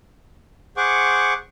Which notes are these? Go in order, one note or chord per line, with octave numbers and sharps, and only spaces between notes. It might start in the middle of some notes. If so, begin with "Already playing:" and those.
G#4 C5 F#5 C#6 D6